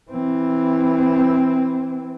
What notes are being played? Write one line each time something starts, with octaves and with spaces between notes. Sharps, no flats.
E3 C4